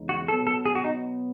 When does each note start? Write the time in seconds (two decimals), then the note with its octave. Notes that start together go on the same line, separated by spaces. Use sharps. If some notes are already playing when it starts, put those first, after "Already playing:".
Already playing: E2 C#3 E3 G#3 D#4
0.09 F#4
0.28 B2 F#3 B3 A4
0.47 A4
0.66 G#4
0.75 F#4
0.84 D#4